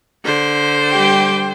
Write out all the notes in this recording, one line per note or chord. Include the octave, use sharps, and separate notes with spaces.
D3 C5
G3 G4 G5